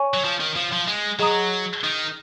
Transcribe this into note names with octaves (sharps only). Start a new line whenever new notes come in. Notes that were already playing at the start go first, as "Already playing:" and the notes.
Already playing: C#5 G#5 C#6
F#3
F3
D#3
F3
F3
G#3
F#3 G#4 D#5 A#5 D#6
D#3